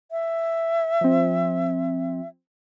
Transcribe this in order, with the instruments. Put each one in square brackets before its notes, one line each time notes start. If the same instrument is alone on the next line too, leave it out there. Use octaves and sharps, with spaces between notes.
[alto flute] E5
[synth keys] F3 C4